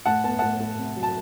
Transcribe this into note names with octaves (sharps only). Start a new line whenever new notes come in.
A2 F#5 A5
B3 A5
A2 F#5 A5
A2
C3
F#3
A5